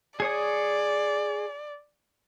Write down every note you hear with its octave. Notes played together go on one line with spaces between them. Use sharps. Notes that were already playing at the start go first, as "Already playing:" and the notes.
G#4 C#5 D5 D#6